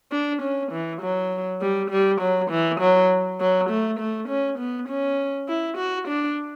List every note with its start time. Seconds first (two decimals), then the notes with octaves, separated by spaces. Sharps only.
0.12 D4
0.42 C#4
0.72 E3
1.01 F#3
1.61 G3
1.90 G3
2.20 F#3
2.50 E3
2.80 F#3
3.40 F#3
3.70 A3
3.99 A3
4.28 C#4
4.59 B3
4.88 C#4
5.48 E4
5.77 F#4
6.07 D4